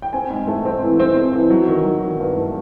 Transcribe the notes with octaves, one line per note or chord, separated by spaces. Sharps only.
G5
C4 G#5
G#2
A3
C4
E3
C4
C4
E3
F#3
D#3
F#3
D#3
G2
A3